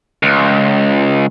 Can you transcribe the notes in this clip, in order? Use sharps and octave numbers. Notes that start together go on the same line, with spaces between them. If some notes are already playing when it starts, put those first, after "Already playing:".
C#2